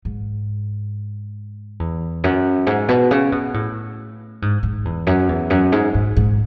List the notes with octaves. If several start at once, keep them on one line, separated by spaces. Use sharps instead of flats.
G#2
E2
F#2
G#2
B2
C#3
B2
A2
G#2
G#2
E2
F#2
E2
F#2
G#2
G#2
G#2